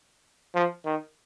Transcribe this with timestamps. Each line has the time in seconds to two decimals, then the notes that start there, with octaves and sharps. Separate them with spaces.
0.55 F3
0.86 D#3